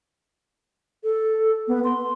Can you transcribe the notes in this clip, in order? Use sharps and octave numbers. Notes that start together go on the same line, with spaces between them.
A4
B3
C6